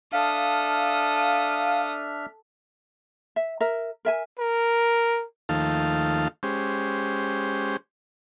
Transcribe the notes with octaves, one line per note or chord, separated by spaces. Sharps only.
D4 A4 E5 F5 D#6 F6
E5
A#4 E5
A#4 E5 G#5
A#4
D#2 D#3 F3 A3 A4 F5
G#3 C#4 G4 C5